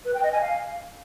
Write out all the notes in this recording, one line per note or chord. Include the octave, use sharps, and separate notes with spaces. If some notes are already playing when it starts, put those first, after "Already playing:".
B4
G5
D#5
G#5
F5